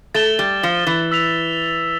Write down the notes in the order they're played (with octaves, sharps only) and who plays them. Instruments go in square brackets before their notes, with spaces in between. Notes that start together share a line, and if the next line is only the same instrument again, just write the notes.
[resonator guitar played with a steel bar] A3 [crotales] A6 E7 G7
[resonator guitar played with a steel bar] G3
F3
E3
[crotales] E6 B6 F7